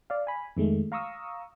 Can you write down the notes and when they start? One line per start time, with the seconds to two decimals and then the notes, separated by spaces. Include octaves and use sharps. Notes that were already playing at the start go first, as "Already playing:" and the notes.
0.10 D5 F5
0.27 G#5 B5
0.57 F2 D#3 G#3 A3
0.92 F5 A#5 C#6 D#6 E6